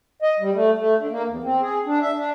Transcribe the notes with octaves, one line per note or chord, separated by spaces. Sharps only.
D#5
G3
A3
A3
D3
A#3
E2
C4
G#4
D4
E5
D4